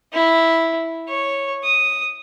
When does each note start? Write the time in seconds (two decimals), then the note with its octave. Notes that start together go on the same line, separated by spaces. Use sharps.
0.14 E4
1.09 C#5
1.64 D#6